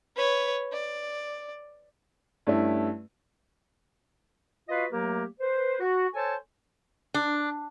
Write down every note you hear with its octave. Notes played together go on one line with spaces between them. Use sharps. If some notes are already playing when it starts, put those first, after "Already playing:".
B4 C#5
D5
G2 A3 C#4 E4
F4 F#4 B4 D#5 F5
F#3 A3 A#3 G4 A#4
B4 C5
F#4
A4 C5 C#5 G#5 A5
D4